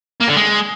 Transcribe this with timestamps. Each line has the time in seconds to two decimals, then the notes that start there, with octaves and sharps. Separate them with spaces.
0.21 A#3
0.29 D3
0.36 G#3